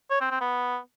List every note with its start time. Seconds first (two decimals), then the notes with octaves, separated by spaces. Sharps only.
0.11 C#5
0.21 C4
0.31 C4
0.41 B3